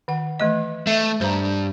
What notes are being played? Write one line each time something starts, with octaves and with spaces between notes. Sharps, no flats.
D#3 F#5
E3 A3 D#5
A3 E5
G2 C5 A#5